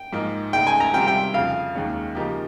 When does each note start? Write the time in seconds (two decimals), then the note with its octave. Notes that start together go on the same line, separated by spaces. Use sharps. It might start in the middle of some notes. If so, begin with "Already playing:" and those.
Already playing: G5
0.13 G#2 F3 A#3 D#4 A#4
0.53 C#3 G#3 D#4 G#4 G5
0.67 G#5
0.80 A#5
0.93 C3 D#3 G3 C4 F4 G5
1.07 G5
1.34 F2 C#3 F3 F5
1.75 D#2 D#3 G#3 C#4
2.15 C#3 F3 A#3 D#4 G4